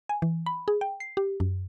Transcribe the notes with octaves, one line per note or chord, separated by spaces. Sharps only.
G#5
E3
B5
G#4
G5
C7
G4
F#2